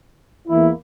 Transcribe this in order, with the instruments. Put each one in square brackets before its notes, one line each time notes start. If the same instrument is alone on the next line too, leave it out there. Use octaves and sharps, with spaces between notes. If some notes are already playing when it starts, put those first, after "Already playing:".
[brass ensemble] E2 E3 A#3 E4